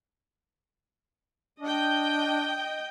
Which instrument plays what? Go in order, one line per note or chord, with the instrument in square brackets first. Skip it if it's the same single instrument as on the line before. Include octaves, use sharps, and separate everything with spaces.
[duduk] D4 [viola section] D#5 G5